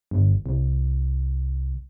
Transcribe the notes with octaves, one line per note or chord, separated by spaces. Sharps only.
G1
C2